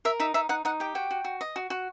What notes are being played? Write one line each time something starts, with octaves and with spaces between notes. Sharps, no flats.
A#4 E5
D#4 E5
D#4 E5
D#4 F#5
D#4 F#5
G4 G5
F#4 G5
F#4
F#4
D#5
F#4
F#4